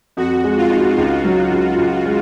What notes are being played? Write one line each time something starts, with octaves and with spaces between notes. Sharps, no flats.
F2 F#4
G#3
F4
D#4
C#2 F4
F#3
C#2
C#2
G#3